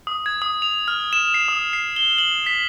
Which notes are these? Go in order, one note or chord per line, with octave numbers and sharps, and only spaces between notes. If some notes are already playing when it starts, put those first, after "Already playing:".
D#6
G#6
D#6
F7
F6
E7
C7
D#6
C7
G7
F#7
B6